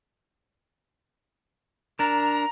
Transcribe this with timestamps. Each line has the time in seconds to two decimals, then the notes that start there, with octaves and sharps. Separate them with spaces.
1.99 D4 A#4 A#5